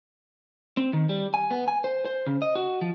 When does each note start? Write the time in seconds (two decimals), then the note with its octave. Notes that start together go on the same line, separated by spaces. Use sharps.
0.77 C4
0.93 D#3
1.09 G3
1.34 G#5
1.51 B3
1.68 G#5
1.84 C5
2.05 C5
2.27 C#3
2.42 D#5
2.55 F#4
2.81 F3